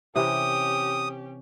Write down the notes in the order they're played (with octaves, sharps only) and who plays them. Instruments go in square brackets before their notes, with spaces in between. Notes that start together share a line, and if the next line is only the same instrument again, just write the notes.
[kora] C3 E3 A#4 [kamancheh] C#4 G4 [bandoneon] D#6